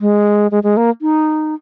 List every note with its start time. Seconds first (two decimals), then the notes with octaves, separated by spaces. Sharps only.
0.01 G#3
0.51 G#3
0.63 G#3
0.77 A#3
1.02 D#4